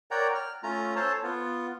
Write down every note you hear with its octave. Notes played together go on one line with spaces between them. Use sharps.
A#4 C#5 D5 F#5 G5 A#5
F6
A3 C#4 F4 A#5
A4 C5 C#5 A5
B3 F4